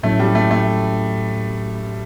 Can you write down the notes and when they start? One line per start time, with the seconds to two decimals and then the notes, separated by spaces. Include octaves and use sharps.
0.03 A2 F#3 A3 C#4 E4
0.20 G3
0.35 A3
0.51 A3